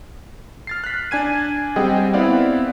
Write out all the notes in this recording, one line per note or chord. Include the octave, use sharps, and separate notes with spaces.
F6 A6 C7
F#6 B6
D4 G#5 G#6 D#7
G3 C4 G#4 D#5 F#5 G5
B3 C4 E4 D5 F5 F#5